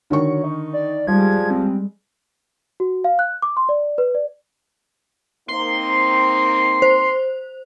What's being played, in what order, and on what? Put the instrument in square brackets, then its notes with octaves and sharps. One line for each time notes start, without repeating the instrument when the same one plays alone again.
[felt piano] D3 D#3 C#6 [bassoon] F#3
[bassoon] D#4
[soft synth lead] D5
[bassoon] F3 [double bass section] G3 G#3 [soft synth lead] G#6
[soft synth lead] C4
[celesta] F#4
F5
F#6
D6
C6
D5
B4
D5
[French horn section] A#3 C4 D#4 [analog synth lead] C6
[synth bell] C5